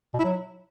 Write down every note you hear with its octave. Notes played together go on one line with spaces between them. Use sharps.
B2
E4
F#3